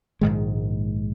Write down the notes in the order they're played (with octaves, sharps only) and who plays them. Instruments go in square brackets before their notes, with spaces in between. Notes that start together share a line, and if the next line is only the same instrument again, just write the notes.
[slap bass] A#1 G#2 D#3 G#3